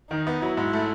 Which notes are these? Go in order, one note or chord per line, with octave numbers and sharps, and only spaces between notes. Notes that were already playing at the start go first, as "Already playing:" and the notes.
D#3 D#4
B3
F#3 E4
G#2
A3